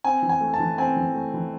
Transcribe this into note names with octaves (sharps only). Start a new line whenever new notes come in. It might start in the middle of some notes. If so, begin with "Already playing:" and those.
C4 G#5
E3
G#5
A3
A5
E3
C4 G#5
E3
A3
E3